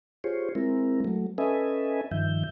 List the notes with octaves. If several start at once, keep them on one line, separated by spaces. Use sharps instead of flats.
F4 G4 G#4 C5 C#5
G#3 C4 E4 A#4
F#3 A3
C#4 A4 B4 D#5 E5 G#5
G2 D#3 F3 E5 G6